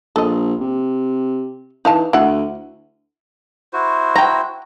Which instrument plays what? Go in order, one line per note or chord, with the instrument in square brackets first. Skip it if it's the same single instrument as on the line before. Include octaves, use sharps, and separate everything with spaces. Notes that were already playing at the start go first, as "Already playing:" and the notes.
[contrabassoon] A#1 [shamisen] A4 D#5
[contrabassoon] C3
[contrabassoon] E3 [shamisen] D#4 F5 A5
[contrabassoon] D2 [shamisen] E4 F#5
[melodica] E4 F#4 C5
[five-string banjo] G5 A#5